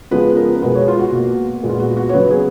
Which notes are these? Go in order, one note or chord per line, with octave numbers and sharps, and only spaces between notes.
C#3 F3 G#3 B3 B4
A#4
B2 G#3 B3 B4
C#5
F4
F#4
B2 A#3
A#2 G#3 B3
F4
F#4
F#4
C#5
C#3 F#3 B3 B4
G#4